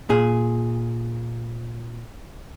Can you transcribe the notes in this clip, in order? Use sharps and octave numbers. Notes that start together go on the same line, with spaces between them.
A#2 G#4